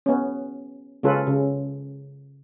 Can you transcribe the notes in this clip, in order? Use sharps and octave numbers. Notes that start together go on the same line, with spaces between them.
B3 C#4
C#3 G#3 C#4 F4 A4 B4
C#3